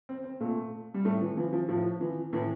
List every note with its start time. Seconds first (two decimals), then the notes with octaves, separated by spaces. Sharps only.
0.09 C4
0.24 C4
0.40 A#2 A3
0.94 G3
1.05 A2 A3
1.21 E3
1.37 E3 F3
1.53 F3
1.68 A2 F3
2.01 E3
2.33 A2 E3